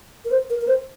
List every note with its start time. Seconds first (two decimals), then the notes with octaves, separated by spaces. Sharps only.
0.25 A#4
0.31 C5
0.50 A#4
0.61 A#4
0.68 C5